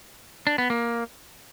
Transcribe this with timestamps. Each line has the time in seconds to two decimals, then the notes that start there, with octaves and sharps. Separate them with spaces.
0.47 D4
0.58 B3
0.70 A#3